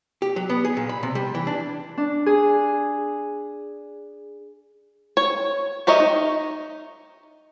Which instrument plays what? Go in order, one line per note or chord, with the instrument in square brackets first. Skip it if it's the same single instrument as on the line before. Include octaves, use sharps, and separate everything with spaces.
[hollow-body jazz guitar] G4
F#3
B3
G#4
A#2
B5
C3
G3
E3
D4
[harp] D4
G#4
[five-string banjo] C#5
G4 A#4 C#5 D#5 E5
D#4